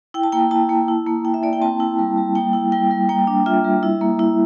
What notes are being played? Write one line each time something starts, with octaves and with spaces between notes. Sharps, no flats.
E4 G5
A5
A#3 G5
E4 A5
A#3
E4
A#3
E4 G5
E5
A#3 D5
G5
C4 A5
E4
G3
G3
A#3 G5
E4
G3 G5
G3
A#3 G5
D4
F4 E5
G3
E4
A#3
E4